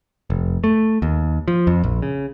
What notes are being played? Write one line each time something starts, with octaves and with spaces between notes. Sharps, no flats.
F1
A3
D#2
F3
F2
A#1
C#3